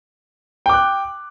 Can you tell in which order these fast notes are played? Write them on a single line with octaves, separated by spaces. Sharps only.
G5 D6 F#6